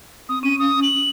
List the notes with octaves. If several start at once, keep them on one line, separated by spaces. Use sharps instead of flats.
C4 D#6
C#4 D#7
D#6
F#7